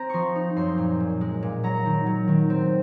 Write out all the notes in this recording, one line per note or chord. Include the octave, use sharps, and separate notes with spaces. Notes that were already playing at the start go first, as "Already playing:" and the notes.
Already playing: C4 A#5
F3 C6 C#6
D#4
F#2 C6
A#2
A#2
G#3
A#2
F#3 A#5
D#3
F#3
D#3
C4